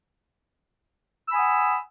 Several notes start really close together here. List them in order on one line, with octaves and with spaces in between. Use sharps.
E6 B5 G#5 D#6 F#5